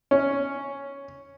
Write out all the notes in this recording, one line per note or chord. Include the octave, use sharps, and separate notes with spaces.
C#4